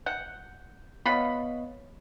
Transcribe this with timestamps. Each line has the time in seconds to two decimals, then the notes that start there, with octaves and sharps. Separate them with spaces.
0.06 F#5 G6
1.06 B3 F4 C#5 D#5 F#5 B5